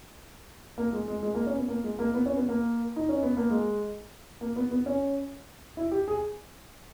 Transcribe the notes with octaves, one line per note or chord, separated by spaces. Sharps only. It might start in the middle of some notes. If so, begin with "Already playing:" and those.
A#3
G#3
G#3
G#3
A#3
C#4
B3
A#3
G#3
A#3
B3
C#4
B3
A#3
D#4
C#4
B3
A#3
G#3
A#3
B3
B3
C#4
E4
G4
G#4